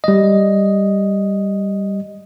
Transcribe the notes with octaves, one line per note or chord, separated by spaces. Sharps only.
G3 D#5